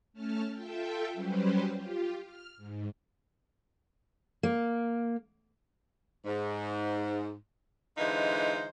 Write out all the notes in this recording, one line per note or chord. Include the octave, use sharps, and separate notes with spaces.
A3 C#4 A5 F6
F4 A4 E5 G5
F#3 G3 C#4 G4 B4 C5
F4 G4
F6
G#2
A#3
G#2
D3 E3 G#3 D#4 F4 C5